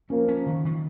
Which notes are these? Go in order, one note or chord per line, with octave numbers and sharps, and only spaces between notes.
F3 A#3 C#4
C#4
D#3
D#3